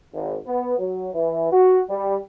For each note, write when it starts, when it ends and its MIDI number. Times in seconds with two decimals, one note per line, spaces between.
0.13 0.37 32
0.46 0.76 59
0.79 1.09 54
1.13 1.49 52
1.52 1.80 66
1.90 2.16 55